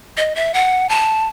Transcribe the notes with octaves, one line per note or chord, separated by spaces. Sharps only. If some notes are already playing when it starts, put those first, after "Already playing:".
D#5
E5
F#5
A5